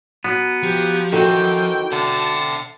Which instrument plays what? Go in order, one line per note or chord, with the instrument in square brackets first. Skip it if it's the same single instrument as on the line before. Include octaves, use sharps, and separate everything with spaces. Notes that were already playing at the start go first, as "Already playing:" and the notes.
[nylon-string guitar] F#3 [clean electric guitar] B3
[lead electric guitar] F3 [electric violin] G4
[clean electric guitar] D#3 E3 C4 [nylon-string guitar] F#4 A4 [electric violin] G5
[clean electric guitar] D3 [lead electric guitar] E5 G5 [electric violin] A5